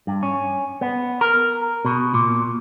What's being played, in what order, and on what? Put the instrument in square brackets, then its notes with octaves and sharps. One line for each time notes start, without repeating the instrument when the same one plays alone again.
[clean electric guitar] G2
C#4
B3
A#4
B2
A#2